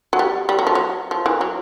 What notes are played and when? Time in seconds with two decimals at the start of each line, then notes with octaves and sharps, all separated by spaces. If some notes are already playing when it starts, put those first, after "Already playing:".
0.13 F#3
0.19 G3
0.49 G3
0.59 F#3
0.67 F3
0.75 F#3
1.11 F3
1.26 E3
1.41 F#3